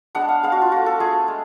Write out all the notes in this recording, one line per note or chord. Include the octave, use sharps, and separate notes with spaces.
G#3 B3 D4 F#5
F5
G#3 B3 D4 F5
F#4
F4
A3 F4 F#4
A4
A3 F4 G#4
G#3